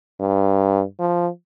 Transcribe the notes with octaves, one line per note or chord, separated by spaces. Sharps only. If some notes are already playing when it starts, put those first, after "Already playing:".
G2
F3